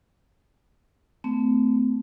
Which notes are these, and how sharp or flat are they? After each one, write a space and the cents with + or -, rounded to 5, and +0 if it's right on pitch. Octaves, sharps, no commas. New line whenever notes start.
A3 +0 C4 -35